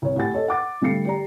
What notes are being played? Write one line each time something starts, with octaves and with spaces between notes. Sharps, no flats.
C2 C#5
A2 G4 F#5 G#5 A6
A4 C#5 D#5
F#5 D6 A6
D3 G3 A3 F5 C7 C#7
G4 D5 A#5